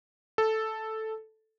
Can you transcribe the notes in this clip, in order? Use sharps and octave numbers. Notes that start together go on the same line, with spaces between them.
A4